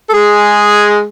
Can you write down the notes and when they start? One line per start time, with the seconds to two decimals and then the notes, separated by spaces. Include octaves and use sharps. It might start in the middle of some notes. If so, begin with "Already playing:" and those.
0.09 A4
0.13 G#3 G#4